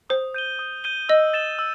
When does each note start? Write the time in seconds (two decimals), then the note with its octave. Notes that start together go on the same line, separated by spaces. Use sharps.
0.10 C5 D#6
0.34 G6 D#7 G7
0.59 D#6
0.84 G6 D#7 G7
1.09 D#5 E6
1.34 A6 E7 G7
1.59 E6